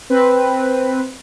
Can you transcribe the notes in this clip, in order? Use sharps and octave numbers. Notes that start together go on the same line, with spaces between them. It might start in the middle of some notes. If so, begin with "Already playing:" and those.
C4 B4